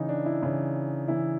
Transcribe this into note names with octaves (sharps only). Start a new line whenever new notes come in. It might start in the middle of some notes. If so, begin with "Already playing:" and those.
Already playing: C#3 E3 D#4
D4
E4
C#3 E3
C#3 E3 E4